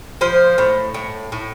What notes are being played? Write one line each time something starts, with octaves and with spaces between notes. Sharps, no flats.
F3 C5
A2
A2
A2